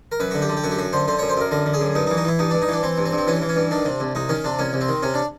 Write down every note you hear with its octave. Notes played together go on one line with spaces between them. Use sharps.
A#4
F#2 B4
D3 F#4
G4
D3
G4
F#2 F#4
G4
F#2 F#4
D3 C5
D3 C5
F#2 C#5
C5
F#2 A#4
D3 A#4
D3
G#4
F#2
G2 D#4
D#4
E3
D#4
E3 E4
G2 D#4
G2 D4
D#4
E3 D4
E3 C4
G2
C4
G2
C4
E3 C#4
E3
C#4
G2
D#3 D4
C3
C2
C2 D#4
D#3 C#4
C3 D4
C2 C#4
C2
C4
D#3
C3 C#4
D4